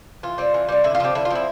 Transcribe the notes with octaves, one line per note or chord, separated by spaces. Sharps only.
E3 F4
G3 C4
E3
G3 C4
D3 E4
F4
F3 C4 G4
D3 E4
F4
F3 C4 E4